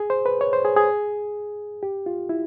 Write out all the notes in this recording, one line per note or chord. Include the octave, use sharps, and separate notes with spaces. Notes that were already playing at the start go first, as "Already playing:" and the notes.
Already playing: G#4
C5
B4
C#5
C5
G#4
G#4
G4
F4
E4